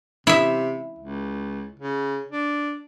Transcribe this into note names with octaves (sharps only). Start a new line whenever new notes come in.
C3 E4 E5
C#2
C#3
D4